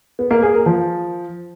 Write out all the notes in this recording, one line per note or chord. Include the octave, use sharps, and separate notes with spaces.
B3
A#3
G#4
A#4
F3